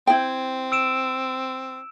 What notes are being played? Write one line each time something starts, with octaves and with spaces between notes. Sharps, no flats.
C4 E4 G5
E6 D7 E7